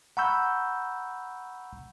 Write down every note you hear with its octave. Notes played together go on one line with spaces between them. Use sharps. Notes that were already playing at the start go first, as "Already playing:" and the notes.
F#5 A#5 B5 C#6 E6 G6